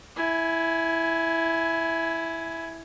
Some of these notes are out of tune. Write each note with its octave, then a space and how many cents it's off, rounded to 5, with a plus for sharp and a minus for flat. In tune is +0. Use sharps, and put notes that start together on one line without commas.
E4 +0 G#5 +15